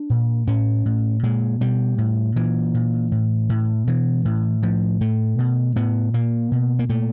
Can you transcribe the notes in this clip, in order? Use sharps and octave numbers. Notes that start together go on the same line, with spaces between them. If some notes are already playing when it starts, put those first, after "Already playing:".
Already playing: D4
A#2
A2 C#4
A2
A#2 G#3
B2 G3
A2
A#2 E3
A#2
A2
A2
B2 E3
A2
A2 F3
A2 A3
B2
A2 B3
A#2 A#3
B2
A#3
A#2 A3